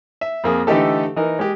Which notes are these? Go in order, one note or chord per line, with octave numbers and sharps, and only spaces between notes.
E5
F2 A#3 G#4
D3 E3 A3 D#4 G4 A4
E3 D#4 A#4
G#3 G4